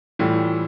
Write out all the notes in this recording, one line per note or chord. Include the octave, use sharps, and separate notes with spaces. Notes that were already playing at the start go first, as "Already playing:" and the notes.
A2 E3 G3 F4